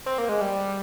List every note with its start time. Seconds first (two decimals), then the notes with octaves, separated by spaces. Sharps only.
0.06 C4
0.18 A#3
0.29 G#3
0.41 G3